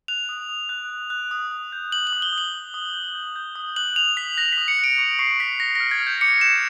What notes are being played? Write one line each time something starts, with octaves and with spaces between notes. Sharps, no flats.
F#6 F7
D#6
D#6
F#6
F#6
F#6
D#6
D#6
G6
G6 F#7
F#7
D#6
G7
D#6
F#7
D#6
D#6
G6
G6
G6
D#6
F#6 F#7
F#6 F7
D#6 B6
F#6 A#6
B6
D#6
C#7
F#6
D7
C#6 C#7
C#6 C7
C#6 B6
C#6 A#6
F6 A#6
G#6
F6
G6
D6 C#7
F#6 E7